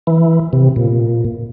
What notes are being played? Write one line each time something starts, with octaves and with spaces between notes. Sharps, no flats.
E3
C3
A#2